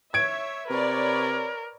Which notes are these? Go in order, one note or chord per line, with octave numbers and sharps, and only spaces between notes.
C#5 E5 G#6 D7
C3 A#4 B4 C#5 D5